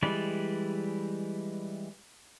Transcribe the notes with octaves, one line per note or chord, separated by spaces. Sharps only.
E3 G3 G#3 B4 D5